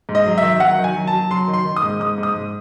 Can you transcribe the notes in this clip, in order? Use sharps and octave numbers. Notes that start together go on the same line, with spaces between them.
G#2
D#5
F#3
E5
D#3
F#3 F#5
D#3
G#5
F#3
A5
F#3
F#3 C6
D#3
C6
D#3
D#6
G#2
G#2 D#6
G#2
D#6
G#2